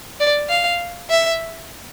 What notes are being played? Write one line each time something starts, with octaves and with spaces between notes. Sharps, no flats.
D5
F5
E5